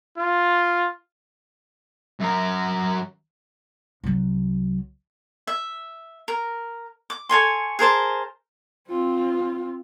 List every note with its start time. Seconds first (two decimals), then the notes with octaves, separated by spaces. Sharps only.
0.18 F4
2.20 F#2 A#4
4.04 C2 F#3
5.47 E5
6.28 A#4
7.10 D6
7.29 A4 C#5 G#5 C6
7.79 G#4 A#4 C5 A5
8.89 C4 F4